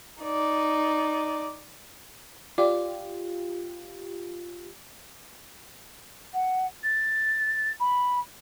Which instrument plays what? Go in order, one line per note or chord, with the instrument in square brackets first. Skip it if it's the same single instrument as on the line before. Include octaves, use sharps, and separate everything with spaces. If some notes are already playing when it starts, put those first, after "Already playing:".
[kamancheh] D#4 D5
[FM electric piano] F4 G4 [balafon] D5 D6
[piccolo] F#5
A6
B5